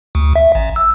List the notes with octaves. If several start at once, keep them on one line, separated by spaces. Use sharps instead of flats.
D2
E5
A1
E6